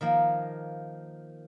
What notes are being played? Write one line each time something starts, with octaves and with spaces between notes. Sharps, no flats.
D#3 F3 A#3